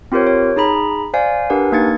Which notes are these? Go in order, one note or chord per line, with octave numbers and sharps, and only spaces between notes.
C4 F4 G4 A#4 C5 C#5
C#5
D#4 G#4 A#5 B5
C5 D5 F5 G#5
D4 G4 A#4 B4 F#5 G#5
A#3 D#4 G#6 A6 C#7